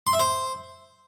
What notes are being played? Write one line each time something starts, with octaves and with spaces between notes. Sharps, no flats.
C6
E5
C5